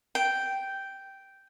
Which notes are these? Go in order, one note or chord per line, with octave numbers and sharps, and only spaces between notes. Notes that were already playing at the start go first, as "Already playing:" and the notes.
G5